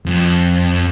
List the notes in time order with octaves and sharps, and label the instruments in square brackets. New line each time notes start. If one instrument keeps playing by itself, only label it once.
[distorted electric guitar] F2